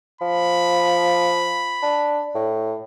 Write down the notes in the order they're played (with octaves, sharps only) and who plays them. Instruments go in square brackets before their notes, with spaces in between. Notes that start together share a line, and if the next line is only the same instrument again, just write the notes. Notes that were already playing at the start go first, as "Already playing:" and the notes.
[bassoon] F3 [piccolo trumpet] B5
[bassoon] D4
A2